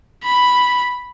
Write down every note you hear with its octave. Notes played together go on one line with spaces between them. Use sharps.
B5